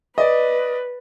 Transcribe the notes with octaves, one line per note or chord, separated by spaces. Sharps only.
B4 D5 D#5